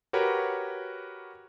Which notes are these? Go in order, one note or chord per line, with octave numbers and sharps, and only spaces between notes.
F#4 G4 A#4 B4 C#5